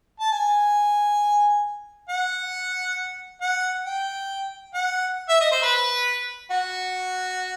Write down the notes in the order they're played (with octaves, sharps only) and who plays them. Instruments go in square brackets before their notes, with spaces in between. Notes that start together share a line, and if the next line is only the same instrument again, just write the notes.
[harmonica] A5
G#5
F#5
F#5
G5
F#5
E5
D#5
C5
B4
F#4